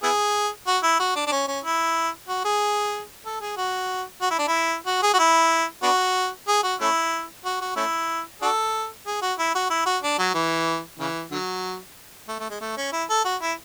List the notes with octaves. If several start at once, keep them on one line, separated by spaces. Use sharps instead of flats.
B3 E4 G#4
F#4
E4
F#4
D4
D4
C#4
C#4
E4
F#4
G#4
A4
G#4
F#4
F#4
E4
D4
E4
F#4
G#4
F#4
E4
B3 D4 F#4
G#4
F#4
A3 C#4 E4
F#4
F#4
A3 C#4 E4
D4 F#4 A4
G#4
F#4
E4
F#4
E4
F#4
D4
F#3
E3
C#3 E3
D3 F#3
A3
A3
G#3
A3
C#4
E4
A4
F#4
E4